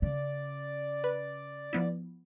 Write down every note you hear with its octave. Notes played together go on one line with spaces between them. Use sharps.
C#3 D5
B4
F3 B3 E4